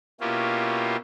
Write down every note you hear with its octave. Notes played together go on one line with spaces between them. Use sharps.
B2 A#3 C#4 E4 F4 G4